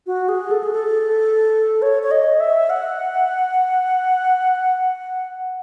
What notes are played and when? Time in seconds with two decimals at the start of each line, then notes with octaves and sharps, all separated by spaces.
0.07 F#4
0.29 G#4
0.51 A4
0.63 G#4
0.73 A4
1.82 C#5
2.03 C#5
2.11 D#5
2.40 E5
2.70 F#5